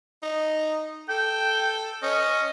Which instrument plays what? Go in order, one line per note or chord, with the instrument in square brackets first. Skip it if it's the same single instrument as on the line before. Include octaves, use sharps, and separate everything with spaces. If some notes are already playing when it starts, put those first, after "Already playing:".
[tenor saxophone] D#4
[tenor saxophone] A4 [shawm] G5
[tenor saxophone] C#4 [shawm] D#5